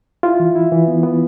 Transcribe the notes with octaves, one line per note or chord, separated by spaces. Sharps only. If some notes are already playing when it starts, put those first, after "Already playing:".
E4 F4
E3
E4
E3
B3
B3